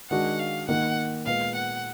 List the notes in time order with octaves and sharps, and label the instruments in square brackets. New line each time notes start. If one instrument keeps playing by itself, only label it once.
[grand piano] D#3 G#3 D4 F#4 [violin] F#5
[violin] F5
[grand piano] D#3 A#3 D#4 [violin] F#5
[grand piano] A#2 G#3 B3 [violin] F5
[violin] F#5